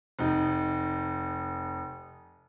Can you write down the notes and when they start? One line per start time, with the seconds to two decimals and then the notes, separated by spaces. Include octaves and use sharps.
0.19 F1 D#4